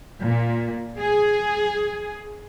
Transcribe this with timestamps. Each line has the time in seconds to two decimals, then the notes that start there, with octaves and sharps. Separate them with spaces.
0.25 A#2
0.99 G#4